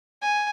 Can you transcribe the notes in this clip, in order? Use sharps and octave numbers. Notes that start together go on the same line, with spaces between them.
G#5